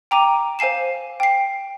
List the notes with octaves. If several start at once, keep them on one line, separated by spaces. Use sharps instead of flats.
G5 A#5 D6 D#7
C5 F5 G#5 C7 E7
G5 C7